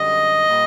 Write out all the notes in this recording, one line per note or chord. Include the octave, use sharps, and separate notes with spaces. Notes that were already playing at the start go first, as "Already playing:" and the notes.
Already playing: F#2 D3 G3 D#5
A#2 G3 A#3